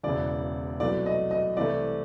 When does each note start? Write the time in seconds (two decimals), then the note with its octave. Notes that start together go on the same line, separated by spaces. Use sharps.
0.03 E1 E2 C#3 E3 D5
0.80 C2 B2 F#3 A3 D5
1.06 D#5
1.31 D#5
1.57 C2 C3 E3 A3 D5